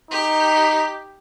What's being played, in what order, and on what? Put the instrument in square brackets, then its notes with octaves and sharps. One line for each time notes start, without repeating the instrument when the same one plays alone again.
[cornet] D#4 [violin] G4 B6